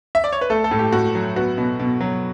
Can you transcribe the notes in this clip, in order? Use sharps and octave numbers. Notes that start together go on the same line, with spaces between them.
E5
D5
C#5
B4
A3 A4
A4
A2
G4
A2 F#4
F#3
B3 F#4
B2
B2
F#3